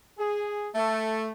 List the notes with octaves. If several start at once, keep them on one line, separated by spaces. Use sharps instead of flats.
G#4
A3